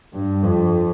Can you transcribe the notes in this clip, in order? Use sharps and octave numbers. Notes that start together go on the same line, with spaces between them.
G2
F2